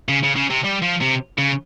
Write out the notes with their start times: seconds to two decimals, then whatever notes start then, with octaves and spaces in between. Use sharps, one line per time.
0.09 C#3
0.23 C#3
0.36 C#3
0.50 C3
0.65 G3
0.83 F3
1.01 C3
1.38 C#3